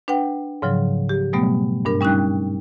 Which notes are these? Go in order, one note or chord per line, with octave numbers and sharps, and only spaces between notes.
D4 B4 F#5 G5
G#2 C#3 F3 F#3
G4
B2 F#3 G3 A3 B3
G2 D4 A#4
G3 C#4 D#4 G5 F#6